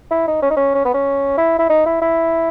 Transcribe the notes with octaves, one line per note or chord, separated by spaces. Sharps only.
E4
D#4
C#4
D#4
C#4
C#4
B3
C#4
E4
E4
D#4
E4
E4